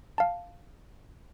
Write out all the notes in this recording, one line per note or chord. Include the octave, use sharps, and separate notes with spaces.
F5 A5